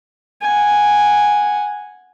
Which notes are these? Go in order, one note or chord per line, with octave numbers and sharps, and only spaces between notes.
F#5 G#5